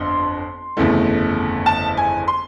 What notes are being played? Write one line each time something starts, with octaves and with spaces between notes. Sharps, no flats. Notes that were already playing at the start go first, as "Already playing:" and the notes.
Already playing: G1 F2 D3 C6
G1 F2 C#3 E3 A3
A5
G#5
C6